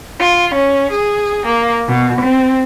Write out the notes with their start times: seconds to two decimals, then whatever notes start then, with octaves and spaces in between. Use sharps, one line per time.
0.19 F4
0.51 C#4
0.89 G#4
1.44 A#3
1.87 B2
2.19 C4